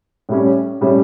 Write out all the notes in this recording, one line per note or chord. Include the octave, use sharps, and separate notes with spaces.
A2 G3 C#4
A2 G3 C#4